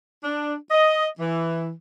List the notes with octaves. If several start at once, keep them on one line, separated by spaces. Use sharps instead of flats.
D4
D#5
E3